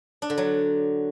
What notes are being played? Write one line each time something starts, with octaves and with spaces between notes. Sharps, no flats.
D4
D3
F#3